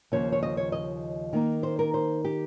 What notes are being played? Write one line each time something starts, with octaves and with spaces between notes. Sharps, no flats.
D#2 C#3 F3 C#5
C#5
D#5
C#5
D#5
D#3 A#3 D#4
C5
A#4
C5
G4